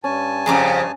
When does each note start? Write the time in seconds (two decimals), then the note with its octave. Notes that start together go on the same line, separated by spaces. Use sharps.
0.04 G2 C#4 G#5 A5
0.46 F2 C#3 G#4 A#5 D6